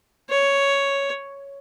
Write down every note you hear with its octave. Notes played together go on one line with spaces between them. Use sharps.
C#5